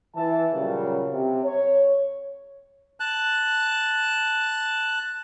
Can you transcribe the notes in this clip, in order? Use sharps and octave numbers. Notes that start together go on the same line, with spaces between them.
E3 A5
A#2 C#3 F#3 G3 A#3 C#4
C3
C#5
A5 F#6